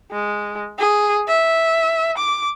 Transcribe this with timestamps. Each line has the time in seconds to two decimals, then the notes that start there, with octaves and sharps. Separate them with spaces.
0.11 G#3
0.78 G#4
1.28 E5
2.17 D6